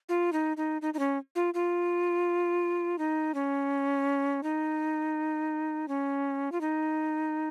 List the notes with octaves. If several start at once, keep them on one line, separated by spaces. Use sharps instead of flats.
F4
D#4
D#4
D#4
D#4
C#4
F4
F4
D#4
C#4
D#4
C#4
F4
D#4